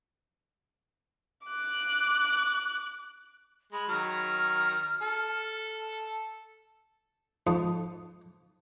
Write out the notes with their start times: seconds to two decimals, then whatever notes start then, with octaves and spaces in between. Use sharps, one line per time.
1.47 D6 F#6
3.73 G#3 B5
3.89 D#3 F#3 A#5 F6
5.02 A4
7.47 F2 G#2 F4 A4 D#6